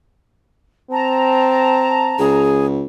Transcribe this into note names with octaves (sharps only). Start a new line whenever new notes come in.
C4 A5 A#5
C#2 G#4